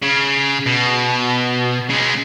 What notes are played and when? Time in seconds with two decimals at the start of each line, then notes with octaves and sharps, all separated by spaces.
0.02 C#3
0.66 B2
1.90 C#3 G#3